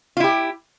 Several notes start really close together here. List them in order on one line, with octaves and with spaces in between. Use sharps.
F4 E4 G4